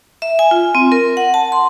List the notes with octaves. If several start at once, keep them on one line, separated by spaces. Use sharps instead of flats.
E5
G#5
F4
C4
A#4
F#5
A5
C6